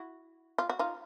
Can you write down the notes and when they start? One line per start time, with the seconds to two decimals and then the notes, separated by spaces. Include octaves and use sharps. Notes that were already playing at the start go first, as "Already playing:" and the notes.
Already playing: E4 F#4
0.58 F4
0.69 F#4
0.79 D#4 F4